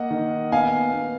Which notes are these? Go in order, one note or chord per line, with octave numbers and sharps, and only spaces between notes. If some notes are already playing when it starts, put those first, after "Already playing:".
Already playing: A#3 D#5 F#5
D#3
B3 F5 G#5
B3